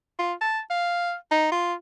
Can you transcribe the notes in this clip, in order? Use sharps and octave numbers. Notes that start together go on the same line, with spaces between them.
F4
A5
F5
D#4
F4